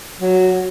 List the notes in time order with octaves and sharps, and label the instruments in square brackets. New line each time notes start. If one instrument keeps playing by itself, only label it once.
[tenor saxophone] F#3